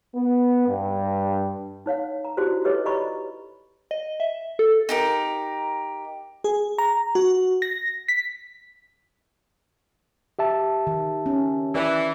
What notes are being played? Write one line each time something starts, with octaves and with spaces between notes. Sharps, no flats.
B3
G2
D#4 C#5 F5 F#5
A#5
D#4 E4 F#4 G4 C5 D5
G4 A4 B4 C#5 D#5 D6
D5 D#5 A#5 B5 C#6
D#5
E5
A4
D#4 G4 A#4
G#4
A#5
F#4
A#6
B6
G4 E5 A5
D#3
C#4
E3 D5